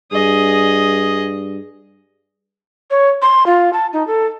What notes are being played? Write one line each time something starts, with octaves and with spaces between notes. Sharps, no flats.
G2 G#4 D#5
C#5
C6
F4
A5
D#4
A4